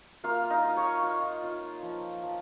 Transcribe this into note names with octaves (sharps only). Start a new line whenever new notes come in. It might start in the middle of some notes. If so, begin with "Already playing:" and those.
A#3 F4 F5
D#4 D#5
F4
C#5 C#6
F4
F4
F3
F3